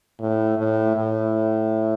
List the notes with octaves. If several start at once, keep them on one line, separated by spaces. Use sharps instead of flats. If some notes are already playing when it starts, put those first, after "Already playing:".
A2
A2
A2